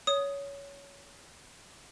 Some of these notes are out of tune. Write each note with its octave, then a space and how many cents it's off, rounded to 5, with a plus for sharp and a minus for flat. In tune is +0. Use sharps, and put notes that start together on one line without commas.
C#5 +20 D#6 +0